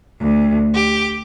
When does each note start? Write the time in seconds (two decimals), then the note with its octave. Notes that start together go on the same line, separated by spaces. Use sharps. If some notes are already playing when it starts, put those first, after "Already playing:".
0.22 D2
0.74 G4